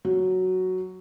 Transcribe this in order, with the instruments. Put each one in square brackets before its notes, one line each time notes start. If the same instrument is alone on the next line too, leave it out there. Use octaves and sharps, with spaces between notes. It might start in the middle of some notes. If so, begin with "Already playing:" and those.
[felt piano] F#3